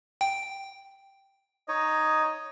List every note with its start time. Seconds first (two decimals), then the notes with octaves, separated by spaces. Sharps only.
0.21 G5
1.68 D#4 C#5 D#5